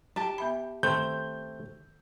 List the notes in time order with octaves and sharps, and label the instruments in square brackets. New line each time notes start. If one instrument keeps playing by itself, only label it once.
[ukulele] G4 A5
[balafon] B3 E5 B5
[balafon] D#3 C6 [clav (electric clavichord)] A3 C4 [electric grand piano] G6